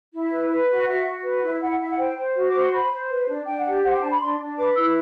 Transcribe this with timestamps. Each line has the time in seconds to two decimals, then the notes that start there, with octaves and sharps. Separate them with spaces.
0.13 E4
0.31 B4
0.49 B4
0.69 F#4
0.86 F#4 E5
1.06 F#4
1.23 B4
1.42 E4
1.51 E5
1.61 E4 F#5
1.79 E4 E5
1.89 F#5
1.97 C5 G5
2.16 C5
2.34 F#4
2.49 C5 D6
2.60 C6
2.71 C5 B5
2.91 C5
3.09 B4
3.27 D4
3.45 D4 G5
3.58 F#5
3.65 G4 G5
3.83 C5 F#5
3.93 G5
4.01 D4 A5
4.11 B5
4.21 D4 C6
4.39 D4
4.57 B4 D6
4.75 E4 E6